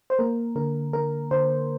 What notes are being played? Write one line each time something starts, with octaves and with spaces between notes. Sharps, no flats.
C5
A#3 A#4
D3 A#4
D3 A#4
D3 C5